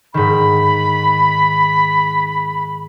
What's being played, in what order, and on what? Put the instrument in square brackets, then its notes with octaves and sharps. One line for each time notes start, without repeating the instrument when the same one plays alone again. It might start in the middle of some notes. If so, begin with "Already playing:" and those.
[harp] G#2 D#3 [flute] B5